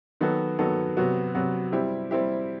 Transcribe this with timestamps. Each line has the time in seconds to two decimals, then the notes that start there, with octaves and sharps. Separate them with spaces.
0.21 D#3 F#3 B3 F#4 A4
0.59 D#3 F#3 B3 F#4 A4
0.97 C3 F#3 B3 F#4
1.35 C3 F#3 B3 F#4
1.72 G3 C4 E4 G4
2.11 G3 C4 E4 G4